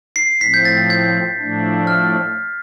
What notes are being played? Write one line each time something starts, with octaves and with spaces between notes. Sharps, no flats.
C7
A2 F3 C4 B6
G6
A6
G6
A2 F3 A3 D4
F6